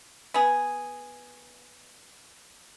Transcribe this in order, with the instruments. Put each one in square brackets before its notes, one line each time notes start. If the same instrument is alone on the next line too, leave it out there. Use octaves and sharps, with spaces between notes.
[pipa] B3 G#4